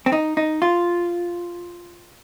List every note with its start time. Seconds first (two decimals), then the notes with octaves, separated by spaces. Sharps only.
0.06 C4
0.12 D#4
0.37 D#4
0.62 F4